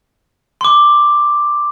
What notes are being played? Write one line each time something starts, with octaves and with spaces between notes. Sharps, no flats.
C6 D6